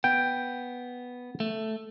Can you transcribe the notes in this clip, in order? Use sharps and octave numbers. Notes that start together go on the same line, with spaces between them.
B3 G5
A3